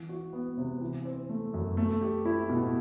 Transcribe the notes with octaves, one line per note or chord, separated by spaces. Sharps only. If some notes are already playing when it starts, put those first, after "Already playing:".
Already playing: E3
F#4
B3
C3
E3
C4
A3
F#2
A3
G4
E4
B2